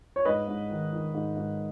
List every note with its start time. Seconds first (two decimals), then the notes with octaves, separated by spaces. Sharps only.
0.16 C#5
0.25 G#2 B4 D#5
0.48 G#2
0.70 D#3
0.92 D#3
1.14 G#2
1.37 G#2